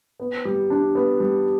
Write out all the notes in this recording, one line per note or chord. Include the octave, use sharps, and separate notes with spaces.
B3
G3
D4
B3
G3